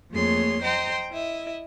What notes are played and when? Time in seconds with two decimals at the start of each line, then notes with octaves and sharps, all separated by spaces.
0.10 F2 A3 A#3 G#4 C#5 C6
0.62 C5 D#5 G5 A#5 C6
1.11 E4 D#5 E5